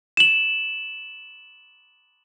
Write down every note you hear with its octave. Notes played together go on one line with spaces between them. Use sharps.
E7 F#7